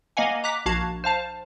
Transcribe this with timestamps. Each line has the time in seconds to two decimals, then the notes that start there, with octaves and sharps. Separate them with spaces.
0.17 A#3 D#5 F5 F#5 G#5
0.44 A#5 D6 F#6 B6
0.66 A#1 F#4 F5 A5 G#6 C7
1.04 C5 F5 A5